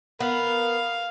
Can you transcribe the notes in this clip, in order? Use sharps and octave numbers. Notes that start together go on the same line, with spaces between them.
B3 A#4 F5